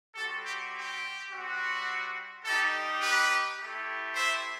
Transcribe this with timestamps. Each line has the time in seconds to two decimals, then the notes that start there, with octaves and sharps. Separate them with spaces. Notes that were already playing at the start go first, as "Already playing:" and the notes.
0.15 G3 C4 F#4 A4
0.43 G4
0.72 G4
1.29 G3 C4 F#4
2.43 G3 D#4 G4 A4
3.00 G4 B4
3.57 A3 E4 G4
4.15 C5 E5